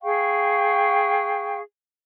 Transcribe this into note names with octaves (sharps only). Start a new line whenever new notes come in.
G#4 F5 G5 C#6